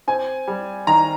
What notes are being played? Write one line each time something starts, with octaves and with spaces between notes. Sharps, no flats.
C4 G#5
G3
D#3 A#5